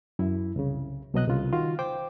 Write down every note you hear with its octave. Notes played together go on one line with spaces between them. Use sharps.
F#2 E4
C2 C#3
C2 B2 F#3 D#5 F#6
C2 C#3 F4
D#3 F4 F#4
C5 G5 D6